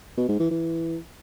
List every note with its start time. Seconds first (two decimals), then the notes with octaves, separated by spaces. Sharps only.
0.17 B2
0.28 G#2
0.39 E3
0.51 E3